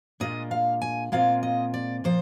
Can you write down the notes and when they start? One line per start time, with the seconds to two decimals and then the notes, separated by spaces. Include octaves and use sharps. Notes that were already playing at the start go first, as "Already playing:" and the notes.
0.20 A#2 G#3 D4 F4 D#5
0.51 F5
0.82 G#5
1.12 A#2 G#3 C4 F4 F5
1.43 D#5
1.74 D5
2.04 A#2 F3 C5